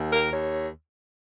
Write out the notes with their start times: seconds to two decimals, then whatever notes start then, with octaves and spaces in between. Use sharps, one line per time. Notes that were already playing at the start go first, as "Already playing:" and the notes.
Already playing: D#2
0.12 A#4
0.31 D#2 C#5